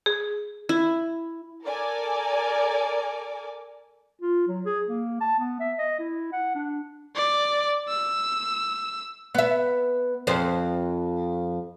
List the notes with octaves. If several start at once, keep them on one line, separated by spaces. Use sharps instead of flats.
G#4
E4
A4 A#4 D5 G#5 D6
F4
F#3
G#4
A#3
A5
B3
E5
D#5
E4
F#5
D4
D5
E6
B3 E5
F2 C5